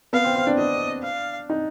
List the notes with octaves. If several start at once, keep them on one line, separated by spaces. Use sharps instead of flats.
B3 F5
C4
C4
D4
D4 D#5
F5
D#4